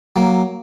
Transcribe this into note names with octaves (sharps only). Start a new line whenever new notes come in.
F#3 A#3